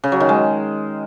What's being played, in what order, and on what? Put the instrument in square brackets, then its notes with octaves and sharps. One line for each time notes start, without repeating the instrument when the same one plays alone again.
[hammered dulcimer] C#3
F#3
D#3
G#3